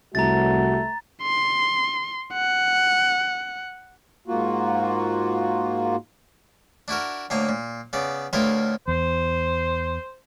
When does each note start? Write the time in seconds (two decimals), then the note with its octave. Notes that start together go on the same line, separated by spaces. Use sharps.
0.15 C2 A3 F#4 A#5 A6
1.22 C6
2.34 F#5
4.28 G#2 A#3 F4 F#4
6.88 D4 E4 F#4 A#4
7.30 D2 A2 A#3 A#5
7.49 A#2
7.93 C#3 B3 D5
8.33 D2 A2 E4 F4 A#4 B4
8.88 E2 C5